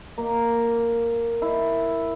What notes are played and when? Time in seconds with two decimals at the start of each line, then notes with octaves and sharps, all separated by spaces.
0.18 A#3
1.42 E4